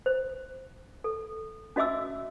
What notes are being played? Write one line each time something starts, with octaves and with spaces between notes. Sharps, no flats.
C5
A4
C#4 F#4 D#5 E5 D6 E6